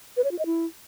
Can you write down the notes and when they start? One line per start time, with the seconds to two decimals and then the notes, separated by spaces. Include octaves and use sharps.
0.17 B4
0.24 C#5
0.31 F4
0.39 D#5
0.46 E4